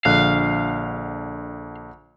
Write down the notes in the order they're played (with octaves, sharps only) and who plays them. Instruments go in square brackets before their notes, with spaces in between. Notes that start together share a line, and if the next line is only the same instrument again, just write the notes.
[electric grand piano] A#1 D3 F#6 [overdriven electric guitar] F5